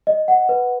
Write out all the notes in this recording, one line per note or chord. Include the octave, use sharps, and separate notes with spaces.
D#5
F#5
B4